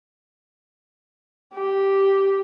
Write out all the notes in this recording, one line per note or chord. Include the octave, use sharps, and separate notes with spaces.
G4